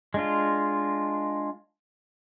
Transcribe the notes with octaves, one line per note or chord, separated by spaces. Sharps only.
G#3 D4 F4